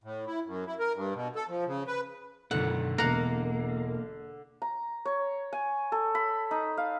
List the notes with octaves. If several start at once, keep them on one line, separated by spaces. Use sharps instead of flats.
A2
E4
F#2
E4
A#4
G2
B2
A4
F3
C#3
B4
F#2 B2 D3 D#3 F#5
E1 A#3 A#4 F#5 F7
A#5
C#5
G#5
A4
B5
D#4
F5